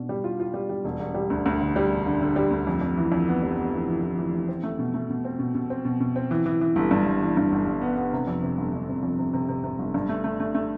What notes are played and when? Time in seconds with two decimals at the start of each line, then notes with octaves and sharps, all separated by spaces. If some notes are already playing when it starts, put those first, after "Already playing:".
Already playing: B2 D4
0.09 G3
0.24 F4
0.40 F4
0.54 G3
0.69 G3
0.85 E1
1.00 E1
1.14 G3
1.30 D2
1.46 D2
1.60 D3
1.76 G3
1.90 E1
2.07 D3
2.21 D3
2.36 G3
2.51 D2
2.67 F2
2.81 F2
2.98 E3
3.12 F2
3.28 B3
3.42 F1
3.57 B3
3.73 E3
3.88 E3
4.03 E3
4.18 E3
4.34 E3
4.48 C4
4.63 A3
4.79 B2
4.94 A3
5.10 B2
5.25 C4
5.39 B2
5.55 B2
5.70 C4
5.85 B2
6.00 B2
6.16 C4
6.31 E3
6.46 E3
6.61 E3
6.76 G1
6.91 G2
7.06 G1
7.22 E3
7.37 G2
7.52 G1
7.66 G1
7.81 B3
7.97 B3
8.13 C3
8.27 F2
8.43 C3
8.58 G1
8.73 G1
8.88 C3
9.03 F2
9.19 C3
9.34 C3
9.49 C3
9.64 C3
9.79 G1
9.94 G2
10.09 A3
10.24 A3
10.40 A3
10.55 A3